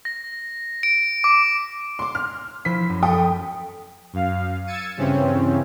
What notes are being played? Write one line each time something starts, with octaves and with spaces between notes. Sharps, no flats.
A#6
D7
D6
C6 D6
F6
F3 E4 C5 B6
F#2
A4 G5 D#6
F#2 F5
E6 G#6 A6 C#7 D#7
G2 C#3 E3 C4 C#4